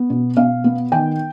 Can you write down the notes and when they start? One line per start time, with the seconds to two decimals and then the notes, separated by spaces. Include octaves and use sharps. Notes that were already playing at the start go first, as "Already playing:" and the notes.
Already playing: B3
0.10 B2
0.37 B2 F5
0.64 B3
0.92 D#3 G5